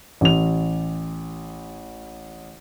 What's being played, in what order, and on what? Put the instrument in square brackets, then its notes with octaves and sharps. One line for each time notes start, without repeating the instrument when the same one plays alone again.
[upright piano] A1 F7